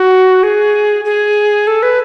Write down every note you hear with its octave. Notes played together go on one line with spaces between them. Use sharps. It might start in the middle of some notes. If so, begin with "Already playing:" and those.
Already playing: F#4
G#4
G#4
A4
B4